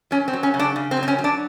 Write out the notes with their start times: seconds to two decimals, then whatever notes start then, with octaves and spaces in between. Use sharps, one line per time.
0.11 F#3 C#4
0.28 C4
0.33 F#3
0.43 C#4
0.54 C#3
0.59 D4
0.76 C#3
0.91 C4
0.97 F#3
1.03 C4
1.08 C#4
1.19 F#3
1.24 D4